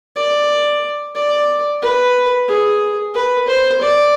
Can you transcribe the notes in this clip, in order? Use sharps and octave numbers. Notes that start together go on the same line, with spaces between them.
D5
D5
B4
G#4
B4
C5
D5